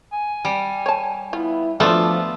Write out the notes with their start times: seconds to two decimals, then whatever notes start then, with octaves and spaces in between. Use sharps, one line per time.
0.13 G#5
0.45 G3
0.86 C#5 A5
1.33 B3 E4 F4
1.80 F3 A3 B3 D4 F4 F#4 A4 D5